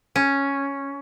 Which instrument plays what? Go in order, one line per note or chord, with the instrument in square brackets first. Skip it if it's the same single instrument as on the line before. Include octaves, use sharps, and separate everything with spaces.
[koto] C#4